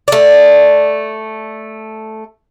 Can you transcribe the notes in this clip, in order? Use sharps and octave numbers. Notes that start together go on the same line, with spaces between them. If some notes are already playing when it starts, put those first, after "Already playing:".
A3 D5